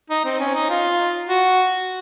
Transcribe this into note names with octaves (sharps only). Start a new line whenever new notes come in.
D#4
C4
C#4
D#4
F4
F#4